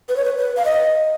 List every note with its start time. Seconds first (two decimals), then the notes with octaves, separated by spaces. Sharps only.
0.09 B4
0.17 C#5
0.25 B4
0.38 B4
0.57 F5
0.65 D#5